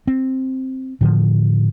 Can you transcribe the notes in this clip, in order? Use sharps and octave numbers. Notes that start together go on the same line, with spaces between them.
C4
A2 D3 F3